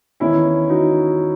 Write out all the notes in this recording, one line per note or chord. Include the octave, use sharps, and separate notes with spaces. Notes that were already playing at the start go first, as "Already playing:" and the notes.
E2 D#3 C#4 E4
D#4 F#4